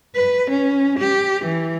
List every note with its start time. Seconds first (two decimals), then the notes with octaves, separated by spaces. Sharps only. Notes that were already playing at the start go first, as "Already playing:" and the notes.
0.15 B4
0.51 C#4
0.99 G4
1.45 E3